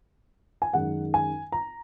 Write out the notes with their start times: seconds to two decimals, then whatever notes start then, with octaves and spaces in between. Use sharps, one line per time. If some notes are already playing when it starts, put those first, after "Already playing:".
0.62 G#5
0.73 F#2 D#3 G#3 D#4 F#5
1.14 G#5
1.52 A#5